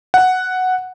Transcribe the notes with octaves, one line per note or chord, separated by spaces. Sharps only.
F#5